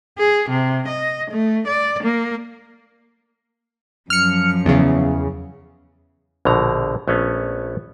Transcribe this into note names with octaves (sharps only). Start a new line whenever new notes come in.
G#4
C3
D#5
A3
D5
A#3
F#2 F3 F6 C#7
E2 C#3
A#1 B2 D3 A#5
A#1 A3 B3 C#4 F5